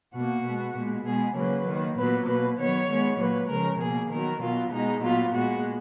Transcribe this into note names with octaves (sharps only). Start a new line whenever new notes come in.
B2 A#3 F#4
B2 G#3 B3
A#2 G#3 B3
B2 G#3 B3 G#4
C#3 F#3 A#3 B4
D#3 A#3
A#2 F#3 B3 B4
B2 A#3 B4
D#3 F#3 B3 C#5
D#3 G#3 B3
A#2 F#3 A#3 B4
C#3 F3 G#3 A#4
B2 A#3 G#4
D#3 F#3 B3 A#4
B2 F#3 B3 F4
B2 G#3 B3 D#4
A#2 F#3 B3 F4
A#2 G#3 B3 F#4